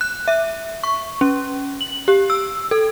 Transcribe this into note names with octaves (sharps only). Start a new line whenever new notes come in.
F#6
E5
C#6
C#4
F#7
G4
E6
A4